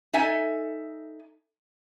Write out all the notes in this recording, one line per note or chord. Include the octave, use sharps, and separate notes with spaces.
D#4 A4 E5 G#5